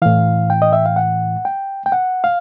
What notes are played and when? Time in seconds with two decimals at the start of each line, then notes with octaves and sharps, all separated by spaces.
0.02 A2 E3 F5
0.50 G5
0.62 D#5
0.73 E5
0.86 F5
0.96 F#5
1.45 G5
1.86 G5
1.92 F#5
2.24 F5